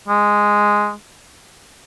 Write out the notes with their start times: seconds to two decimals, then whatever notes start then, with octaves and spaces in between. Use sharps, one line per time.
0.08 G#3